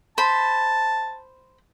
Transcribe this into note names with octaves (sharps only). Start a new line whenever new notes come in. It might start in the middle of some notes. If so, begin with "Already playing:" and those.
C5 A5 B5